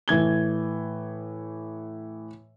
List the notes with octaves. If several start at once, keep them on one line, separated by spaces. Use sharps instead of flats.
A2 E3 G#6 G7